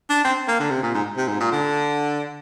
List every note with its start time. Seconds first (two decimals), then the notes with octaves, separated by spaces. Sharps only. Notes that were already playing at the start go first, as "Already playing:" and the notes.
0.10 D4
0.24 C4
0.48 A#3
0.60 D3
0.70 C3
0.83 A#2
0.94 G#2
1.17 C3
1.28 G#2
1.40 A#2
1.52 D3